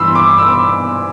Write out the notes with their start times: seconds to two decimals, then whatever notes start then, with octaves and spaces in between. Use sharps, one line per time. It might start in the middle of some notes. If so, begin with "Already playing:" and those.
Already playing: G2 E3 B5 C6 E6
0.15 D6
0.38 E6
0.49 D6